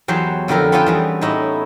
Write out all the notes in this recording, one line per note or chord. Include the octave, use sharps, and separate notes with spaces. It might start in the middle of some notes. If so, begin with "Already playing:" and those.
E2 F#3 G4 C5 C#5
F2 D3 E4 G4 A#4 A#5
B3 C#4 F4 A4 B4 G5
E3 G3 G#4
A2 C#4 D#4 E4